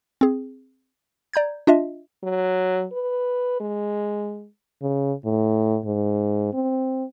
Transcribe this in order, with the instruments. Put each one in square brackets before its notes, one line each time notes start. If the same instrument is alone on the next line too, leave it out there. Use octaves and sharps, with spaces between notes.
[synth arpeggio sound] C4 G#4
D5 A#5 G6 G#6
D4 F4 D#5 E5
[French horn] F#3
B4
G#3
C#3
A2
G#2
C4